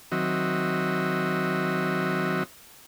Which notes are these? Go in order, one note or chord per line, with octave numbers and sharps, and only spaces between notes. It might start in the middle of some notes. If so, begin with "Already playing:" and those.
D#3 F#3 C4 F#4 D#5 E5